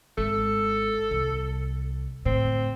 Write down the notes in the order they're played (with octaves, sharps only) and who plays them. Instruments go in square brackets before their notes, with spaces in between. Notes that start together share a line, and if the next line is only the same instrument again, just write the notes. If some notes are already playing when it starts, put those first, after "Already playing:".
[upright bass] G#1 [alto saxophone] A4
[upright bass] C2
[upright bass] A2 D3 [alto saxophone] C4